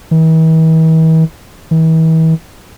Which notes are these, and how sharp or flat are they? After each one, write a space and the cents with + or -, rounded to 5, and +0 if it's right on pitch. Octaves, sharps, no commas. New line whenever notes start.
E3 -45
E3 -40